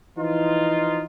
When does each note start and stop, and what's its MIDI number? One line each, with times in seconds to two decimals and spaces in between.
0.17 1.02 52
0.17 1.02 53
0.17 1.02 63
0.17 1.02 65